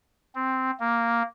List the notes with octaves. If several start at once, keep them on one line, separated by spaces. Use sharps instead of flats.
C4
A#3